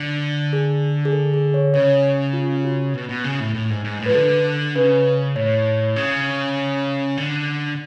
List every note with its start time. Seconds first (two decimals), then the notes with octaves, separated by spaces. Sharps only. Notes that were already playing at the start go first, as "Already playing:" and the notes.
Already playing: D3
0.53 G#4
1.05 G#4
1.13 A4
1.34 G#4
1.54 C#5
1.74 C#3 C#5
2.33 F4
2.65 F#4
2.94 B2
3.09 B2
3.24 C#3
3.40 A2
3.55 A2
3.70 G#2
3.84 G#2
3.99 A2
4.06 F3 B4
4.14 D3 A4
4.75 C#3 B4
5.35 A2 C#5
5.96 C#3
7.17 D3